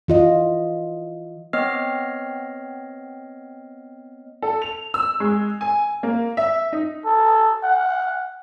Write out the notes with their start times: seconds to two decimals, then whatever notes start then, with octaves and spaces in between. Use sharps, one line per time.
0.08 E3 F4 D#5
1.53 B3 C4 C#5 D#5 F6 C7
4.42 A4
4.62 F7
4.94 E6
5.20 G#3
5.61 G#5
6.03 A#3
6.37 E5
6.73 D#4
7.05 A4
7.63 F#5